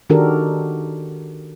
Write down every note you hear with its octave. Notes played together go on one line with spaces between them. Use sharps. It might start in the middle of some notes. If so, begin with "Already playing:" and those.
D#3 D4 F#4 G4 A4 A#4